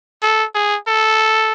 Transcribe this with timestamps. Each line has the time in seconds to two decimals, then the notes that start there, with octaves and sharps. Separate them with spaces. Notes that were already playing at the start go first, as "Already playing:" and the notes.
0.22 A4
0.55 G#4
0.87 A4